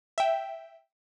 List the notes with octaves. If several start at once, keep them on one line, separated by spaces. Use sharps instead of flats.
E5 G5